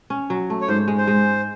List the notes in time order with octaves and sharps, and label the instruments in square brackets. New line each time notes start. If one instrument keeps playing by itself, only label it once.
[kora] C#4
F#3
A3
[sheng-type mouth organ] C#5
[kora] G#2 [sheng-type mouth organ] C5
[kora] G#3
[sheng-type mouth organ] C5
[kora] G#3